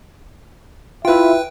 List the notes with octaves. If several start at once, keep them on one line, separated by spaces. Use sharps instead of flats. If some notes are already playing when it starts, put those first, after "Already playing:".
E4 F4 B4 E5 G5